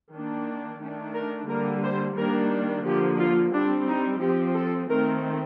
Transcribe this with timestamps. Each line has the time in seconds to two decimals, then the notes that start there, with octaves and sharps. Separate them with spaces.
0.13 D#3 A#3 D4
0.81 D#3 A3 D4
1.15 A#4
1.49 D3 G3 A#3 A#4
1.83 C5
2.17 D#3 G3 A#3 D4 A#4
2.85 D3 F3 A#3 G4
3.19 F4
3.53 G3 C4 D4
3.88 D#4
4.21 F3 C4 G4
4.55 A4
4.89 D#3 A3 C4 A#4